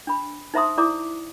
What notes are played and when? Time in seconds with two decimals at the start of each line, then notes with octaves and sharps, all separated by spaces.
0.07 D4 B5
0.54 D#4 C5 E5 A#5 C6 D#6
0.78 E4 D5 A#5 D6 D#6